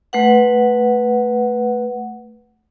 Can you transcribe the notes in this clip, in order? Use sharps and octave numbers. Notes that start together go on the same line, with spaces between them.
A3 B4 F#5